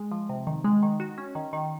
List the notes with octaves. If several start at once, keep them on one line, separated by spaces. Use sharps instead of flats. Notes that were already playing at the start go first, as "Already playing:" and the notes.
Already playing: G#3
F3
C3
D#3
G#3
D#3
F#4
C#4
D#3
D#3